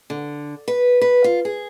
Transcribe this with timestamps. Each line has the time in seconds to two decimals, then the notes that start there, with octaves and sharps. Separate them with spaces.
0.10 D3
0.68 B4
1.01 B4
1.24 F4
1.45 G#4